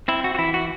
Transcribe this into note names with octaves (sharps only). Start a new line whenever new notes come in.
C4 E4
F#4
F#4
E3 E4
F#4